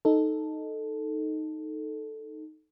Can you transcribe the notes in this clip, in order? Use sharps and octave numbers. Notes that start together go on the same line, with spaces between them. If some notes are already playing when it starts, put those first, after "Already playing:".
D#4 A4